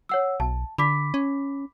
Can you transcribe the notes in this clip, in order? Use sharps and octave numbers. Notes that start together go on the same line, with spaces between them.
C#5 F#5 E6
B1 A5
D3 B5 D6 B6
C#4